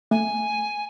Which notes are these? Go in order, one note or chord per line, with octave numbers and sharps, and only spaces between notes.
A3 G#5